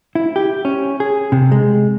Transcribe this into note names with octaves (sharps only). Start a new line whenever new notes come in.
E4
G4
C#4
G#4
C3
G#3